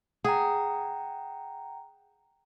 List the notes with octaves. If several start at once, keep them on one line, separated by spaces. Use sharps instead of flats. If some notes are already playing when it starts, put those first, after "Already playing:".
G#4 F#5 G5 A#5